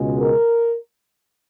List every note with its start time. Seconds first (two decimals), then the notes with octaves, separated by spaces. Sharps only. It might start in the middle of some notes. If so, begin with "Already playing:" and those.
Already playing: C#2 B2 G#3
0.20 A#4